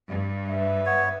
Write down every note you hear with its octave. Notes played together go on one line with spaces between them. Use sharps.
G2
B4 E5
B3 C#5